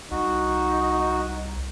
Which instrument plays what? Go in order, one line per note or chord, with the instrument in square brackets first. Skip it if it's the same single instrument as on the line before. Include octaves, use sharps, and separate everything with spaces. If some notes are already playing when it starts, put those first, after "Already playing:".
[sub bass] C2 [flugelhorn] D#4 [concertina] F#4